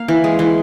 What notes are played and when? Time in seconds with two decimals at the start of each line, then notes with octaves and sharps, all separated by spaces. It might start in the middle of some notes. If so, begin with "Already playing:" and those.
Already playing: A#3 F5
0.08 E3
0.24 G#3
0.39 E3